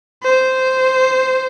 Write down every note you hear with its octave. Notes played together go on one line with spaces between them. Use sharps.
C5